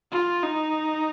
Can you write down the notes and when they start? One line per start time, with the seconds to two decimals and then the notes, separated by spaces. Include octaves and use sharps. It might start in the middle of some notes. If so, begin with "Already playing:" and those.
0.12 F4
0.43 D#4